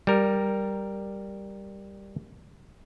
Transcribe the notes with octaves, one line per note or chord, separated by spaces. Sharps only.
G3 A#4